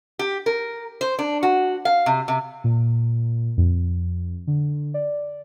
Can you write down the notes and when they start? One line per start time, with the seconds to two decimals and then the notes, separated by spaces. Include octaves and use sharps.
0.19 G4
0.46 A#4
1.01 C5
1.19 D4
1.43 F#4
1.85 F5
2.06 C3
2.28 C3
2.64 A#2
3.57 F2
4.47 D3
4.94 D5